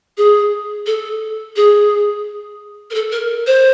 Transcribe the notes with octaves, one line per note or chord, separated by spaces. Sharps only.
G#4
A4
G#4
A#4
A4
A#4
C5